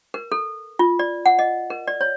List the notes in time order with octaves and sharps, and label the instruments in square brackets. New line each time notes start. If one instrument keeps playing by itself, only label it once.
[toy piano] A#4
A4
F4
D5
F#5
D#5
A#4
D5
C#5